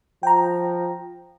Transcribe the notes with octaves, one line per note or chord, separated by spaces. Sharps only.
F3 G5 A#5